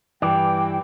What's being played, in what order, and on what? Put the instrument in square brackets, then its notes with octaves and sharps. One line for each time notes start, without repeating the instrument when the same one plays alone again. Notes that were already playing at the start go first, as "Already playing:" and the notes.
[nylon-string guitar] G2 E3 [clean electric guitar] G4 D5 [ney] G5